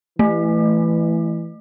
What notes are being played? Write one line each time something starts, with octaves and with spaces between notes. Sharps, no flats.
E3 A3